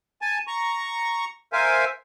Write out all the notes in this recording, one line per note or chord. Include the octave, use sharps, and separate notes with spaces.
G#5 A5
A#5 C#6
A#4 C5 E5 F5 G#5